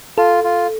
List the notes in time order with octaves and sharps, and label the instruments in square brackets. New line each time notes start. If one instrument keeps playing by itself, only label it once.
[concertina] F4 [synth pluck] A4
[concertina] F4